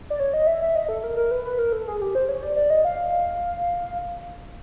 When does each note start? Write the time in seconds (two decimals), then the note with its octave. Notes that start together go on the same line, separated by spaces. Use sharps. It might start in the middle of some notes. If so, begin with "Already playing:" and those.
0.10 D5
0.20 C#5
0.34 D#5
0.47 E5
0.62 E5
0.76 D#5
0.89 A4
1.03 A#4
1.17 A#4
1.31 B4
1.45 B4
1.59 A#4
1.73 A4
1.88 G#4
2.01 G4
2.15 C5
2.29 C#5
2.43 D5
2.56 D5
2.70 D#5
2.85 F5